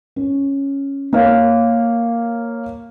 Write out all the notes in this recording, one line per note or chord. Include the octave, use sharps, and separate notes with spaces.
C#4
A#3 C#5 F5